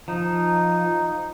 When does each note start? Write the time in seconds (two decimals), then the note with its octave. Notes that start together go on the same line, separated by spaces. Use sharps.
0.08 F3 D#4